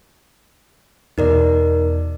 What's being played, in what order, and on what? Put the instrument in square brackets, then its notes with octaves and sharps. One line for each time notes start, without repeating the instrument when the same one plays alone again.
[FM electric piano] E2 B2 [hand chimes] D#4 A#4 D5